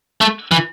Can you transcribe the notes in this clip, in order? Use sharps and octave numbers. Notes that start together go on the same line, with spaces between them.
A3
E3